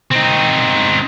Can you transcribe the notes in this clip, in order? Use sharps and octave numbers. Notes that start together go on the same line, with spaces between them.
C4 D#4